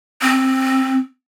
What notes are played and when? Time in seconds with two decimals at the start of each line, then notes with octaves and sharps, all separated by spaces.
0.22 C4